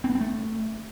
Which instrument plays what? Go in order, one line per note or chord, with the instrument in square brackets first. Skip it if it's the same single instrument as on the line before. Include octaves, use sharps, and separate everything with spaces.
[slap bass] C4
B3
C4
A3